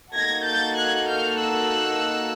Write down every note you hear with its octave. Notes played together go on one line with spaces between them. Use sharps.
A#3 D#4 F#4 A4 G#6 A#6
G6 A6
F#6 G#6
F6 G6
E6 F#6